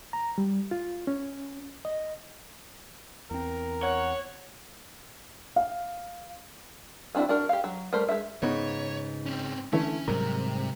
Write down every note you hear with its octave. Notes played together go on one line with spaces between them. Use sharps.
A#5
G3
F4
C#4
D#5
E2 C4 A#4
C#5 F#5
F5
B3 C4 D4 E4 F#4
D4 F#4 A#4
G4 F5
F#3
G3 A3 A#4 C5
G#3 C5 E5
G#2 C#3 B3 D#4 C#5
C4 C#4
D3 E3 A3 C#4 E4
G#2 C3 F#3 G3 A#4